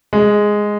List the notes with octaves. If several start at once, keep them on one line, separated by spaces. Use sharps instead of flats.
G#3